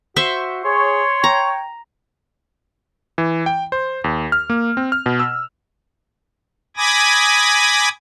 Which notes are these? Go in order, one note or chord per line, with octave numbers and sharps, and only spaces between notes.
F#4 C5 E5 C#6
G#4 C#5 C6
G5 A#5
E3
G5
C5
D#2
F6
A#3
C4
F6
B2
E6
G#5 B5 D6 D#6 G#6 A#6